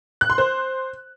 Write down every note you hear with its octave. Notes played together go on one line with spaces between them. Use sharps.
F#6
C6
C5